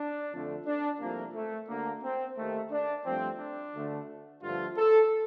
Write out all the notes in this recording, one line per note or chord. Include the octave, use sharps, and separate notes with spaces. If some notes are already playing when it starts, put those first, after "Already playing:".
Already playing: D4
F2 D3 F3 A3
D4
C2 C3 F3 A3 A#3
A3
D2 D3 A3 A#3
C4
D#2 D#3 A3
D4
G2 F3 A3 C4
D4
D2 D3 A3
G2 D3 F3 A3 F4
A4